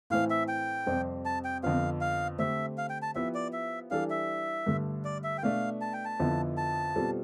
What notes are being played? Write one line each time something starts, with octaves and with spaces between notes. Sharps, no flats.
A2 E3 A3 C4 F5
E5
G5
F2 C3 G3 C4 G4
A5
G5
F2 D3 F3 B3 F5
F5
D3 A3 C4 G4 E5
F5
G5
A5
F3 B3 E4 G4 E5
D5
E5
E3 G3 D4 A4 F5
E5
G2 D3 A3
D5
E5
G5
B2 A3 D4 F5
A5
G5
A5
F2 D3 F3 B3 E4
A5
B2 G3 C4 F4 A4